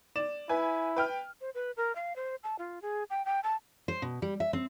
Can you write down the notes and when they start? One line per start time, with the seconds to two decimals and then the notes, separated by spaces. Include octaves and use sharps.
0.16 D5 E7
0.49 E4 B4 G#5
0.97 B4 G5 F6
1.41 C5
1.54 B4
1.77 A#4
1.95 F5
2.16 C5
2.43 A5
2.59 F4
2.82 G#4
3.10 G5
3.25 G5
3.43 A5
3.88 C5
4.02 B2
4.22 G3
4.40 E5
4.53 C4